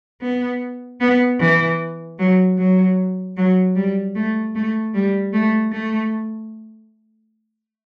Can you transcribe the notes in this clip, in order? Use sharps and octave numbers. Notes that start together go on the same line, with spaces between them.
B3
B3
E3
F#3
F#3
F#3
G3
A3
A3
G3
A3
A3